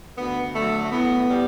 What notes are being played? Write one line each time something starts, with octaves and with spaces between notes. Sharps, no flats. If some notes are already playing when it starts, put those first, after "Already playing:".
D2 B3
D3 F#3 A3
A3
A2 B3
G3